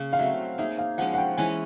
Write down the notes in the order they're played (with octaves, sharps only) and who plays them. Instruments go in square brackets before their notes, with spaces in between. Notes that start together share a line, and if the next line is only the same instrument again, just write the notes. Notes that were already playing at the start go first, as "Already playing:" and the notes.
Already playing: [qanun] C#3 A#3
[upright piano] F5
[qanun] F#3 A3 C4 [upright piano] E5
[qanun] A#3 D#4 G#4 [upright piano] E5
[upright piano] F5
[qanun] F3 G#3 C#4 [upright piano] F#5
[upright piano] F#5
G5
[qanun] E3 G#3 C#4 [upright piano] G#5